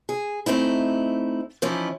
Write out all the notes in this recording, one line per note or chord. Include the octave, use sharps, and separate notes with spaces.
G#4
A3 C4 D#4 E4
E3 F3 C#4 D#4 E4